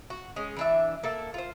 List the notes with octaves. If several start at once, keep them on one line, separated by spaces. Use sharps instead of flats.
F#4
G#3 C#4
E3 D4 E5
A#3 A4 E5
F4 C5